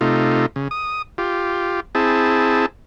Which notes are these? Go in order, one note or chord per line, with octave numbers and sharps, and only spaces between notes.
C3 A3 D#4 F4
C#3
D#6
F4 G4
C4 E4 G#4 A5